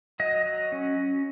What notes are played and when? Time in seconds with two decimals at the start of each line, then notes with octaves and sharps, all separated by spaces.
0.20 F#3 D#5
0.46 F#3
0.72 C#4